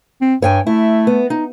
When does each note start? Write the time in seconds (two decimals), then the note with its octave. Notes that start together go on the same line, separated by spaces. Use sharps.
0.21 C4
0.42 G2 C#5 G5 G#5
0.67 A3 E4
1.07 B3
1.30 D#4